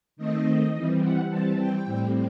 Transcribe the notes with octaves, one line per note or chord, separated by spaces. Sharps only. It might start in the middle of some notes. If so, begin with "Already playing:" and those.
D#3 A3 C4 D#5
E3 G3 C4
F#5
E3 G3 C4 A5
G5
A2 G3 C4